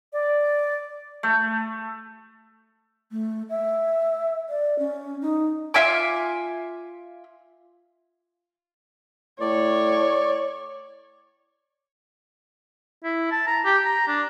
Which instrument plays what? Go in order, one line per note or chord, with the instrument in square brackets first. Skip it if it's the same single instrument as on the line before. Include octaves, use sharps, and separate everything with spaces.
[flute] D5
[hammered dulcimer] A3
[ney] A3
E5
D5
C#4
D#4
[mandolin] F4 E5 G#5 D6
[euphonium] A2 [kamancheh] C#5 [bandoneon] D5
[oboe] E4
A5
A#5
G4
A#5
D4